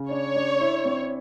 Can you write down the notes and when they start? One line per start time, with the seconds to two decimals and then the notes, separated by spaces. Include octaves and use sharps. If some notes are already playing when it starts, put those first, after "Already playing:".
Already playing: C#3
0.10 D4 C#5
0.36 D4
0.61 E4
0.85 C4